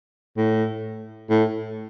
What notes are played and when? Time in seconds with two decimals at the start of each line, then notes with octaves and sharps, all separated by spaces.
0.37 A2
1.30 A2